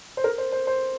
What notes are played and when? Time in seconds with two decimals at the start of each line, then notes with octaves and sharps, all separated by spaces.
0.17 C5
0.24 A#4
0.38 C5
0.52 C5
0.67 C5